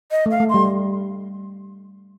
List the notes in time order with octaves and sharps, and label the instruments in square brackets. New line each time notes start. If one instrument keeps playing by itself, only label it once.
[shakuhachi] D#5
[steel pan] A3
[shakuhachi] F5
[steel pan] A3
[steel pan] G3 [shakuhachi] C6